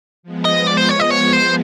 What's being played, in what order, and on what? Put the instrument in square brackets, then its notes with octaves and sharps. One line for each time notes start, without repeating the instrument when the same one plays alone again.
[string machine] F3 G#3 B3
[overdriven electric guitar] D#5
D5
C5
C#5
D#5
C#5
C5